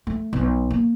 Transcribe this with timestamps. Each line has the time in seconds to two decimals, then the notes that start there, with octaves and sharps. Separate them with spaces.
0.07 A3
0.33 B1
0.71 A#3